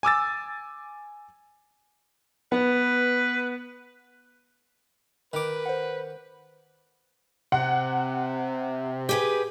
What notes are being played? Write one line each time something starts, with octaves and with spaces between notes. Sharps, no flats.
G#5 D6 E6 A6
B3 B4
D#3 B4 D6
C5 F#5
C3 F#5
G4 G#4 B4